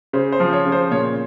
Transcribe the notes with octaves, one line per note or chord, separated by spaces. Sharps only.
C#3 C5
C5
F3
C#5
C#3
C5
A#2 C#5